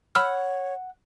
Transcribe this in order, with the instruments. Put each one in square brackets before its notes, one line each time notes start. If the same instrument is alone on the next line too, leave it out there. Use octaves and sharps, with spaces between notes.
[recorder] C#5 [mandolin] F#5 [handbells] B5 E6 F6